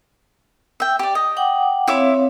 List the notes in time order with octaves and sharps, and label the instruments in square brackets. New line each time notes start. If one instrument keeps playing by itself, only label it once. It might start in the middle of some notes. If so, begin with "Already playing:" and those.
[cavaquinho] E5 G5
G4 D5
D#5
[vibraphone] F#5 G5 D6
[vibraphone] C4 C#5 F5 [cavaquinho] E4 E5 D6